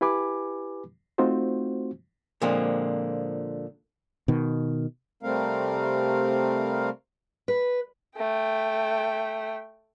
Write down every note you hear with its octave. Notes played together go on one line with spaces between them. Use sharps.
E4 G4 B4 G#5 B5 D6
A3 C4 D#4 F4 F#4 C5
A#2 D3 F3 G#3 A#3 C4
B2 D#3
C3 G3 A3 C4 A#4 F5
B4
A3 G5